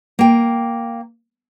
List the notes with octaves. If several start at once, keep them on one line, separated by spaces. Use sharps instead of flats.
A#3 G5